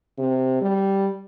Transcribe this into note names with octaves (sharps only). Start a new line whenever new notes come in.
C3
G3